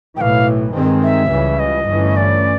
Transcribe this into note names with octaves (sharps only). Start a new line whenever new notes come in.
B1 A2 E3 F5 G5
G2 D#3 G#3 C4
E5
C#2 C#3 E3 G3
D#5
G1 G2 E3 A3 C#4
D5